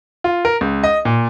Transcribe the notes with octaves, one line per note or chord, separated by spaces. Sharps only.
F4
A#4
C#2
D#5
A#2